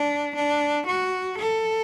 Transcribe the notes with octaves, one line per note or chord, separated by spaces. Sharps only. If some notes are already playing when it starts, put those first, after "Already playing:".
Already playing: D4
D4
F#4
A4